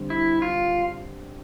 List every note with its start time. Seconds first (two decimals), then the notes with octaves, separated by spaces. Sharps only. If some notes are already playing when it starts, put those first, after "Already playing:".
Already playing: D3 G3 C4
0.10 E4
0.42 F4